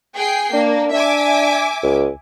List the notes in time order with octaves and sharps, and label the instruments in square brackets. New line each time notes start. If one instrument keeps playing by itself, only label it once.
[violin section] G#4 G5 C7
[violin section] A#3 [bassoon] D4
[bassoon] D4 [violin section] E5 G#5 D6
[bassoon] C#2